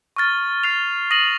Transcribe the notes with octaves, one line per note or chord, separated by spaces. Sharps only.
C#6 F6 A6
F6 C7 F7
D#6 A#6 D#7 F#7